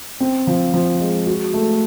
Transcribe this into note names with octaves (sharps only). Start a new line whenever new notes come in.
C4
F3
F3
G#3
F#4
A3